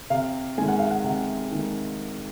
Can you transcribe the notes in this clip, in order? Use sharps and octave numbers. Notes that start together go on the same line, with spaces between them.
C3 F5
D#3 G#3 G#5
F#5
F5
F#5
C3 F#5
D#3 G#3